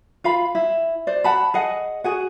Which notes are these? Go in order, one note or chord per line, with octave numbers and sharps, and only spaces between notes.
F4 F5 B5
E4
C5 D5
F#5 A5 B5
G#4 D#5 F#5
F#4 G#4 F#5